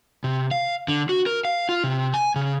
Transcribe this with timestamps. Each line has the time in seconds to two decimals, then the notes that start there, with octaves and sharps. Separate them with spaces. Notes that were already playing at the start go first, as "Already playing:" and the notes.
0.24 C3
0.51 F5
0.88 D3
1.09 F#4
1.26 A#4
1.45 F5
1.69 F4
1.84 C3
2.14 G#5
2.36 C#3